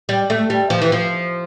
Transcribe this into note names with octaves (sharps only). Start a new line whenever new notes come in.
G3
A3
G3
F3
E3
F3